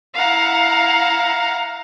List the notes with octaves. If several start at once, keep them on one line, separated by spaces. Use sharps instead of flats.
E4 F5 F#5 A#5